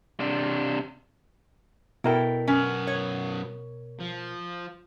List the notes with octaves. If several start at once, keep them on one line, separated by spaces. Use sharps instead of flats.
C3 D4
B2 E4 A4 A#4 G5
F#2 B3 C#4
C#5
F3